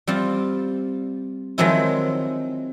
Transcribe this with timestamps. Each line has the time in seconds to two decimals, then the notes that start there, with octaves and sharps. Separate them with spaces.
0.07 G3 C4 F4
1.58 D#3 F3 F#3 G#3 C4 E4